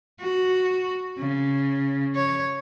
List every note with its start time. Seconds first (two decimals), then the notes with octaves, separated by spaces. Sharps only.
0.20 F#4
1.19 C#3
2.16 C#5